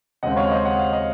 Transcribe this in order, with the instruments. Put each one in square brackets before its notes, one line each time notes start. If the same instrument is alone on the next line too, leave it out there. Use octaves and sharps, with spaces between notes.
[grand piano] D#2 C#3 G#3 C4 D#5 F#5
C#5 F5
C5 D#5
F#5
F5
D#5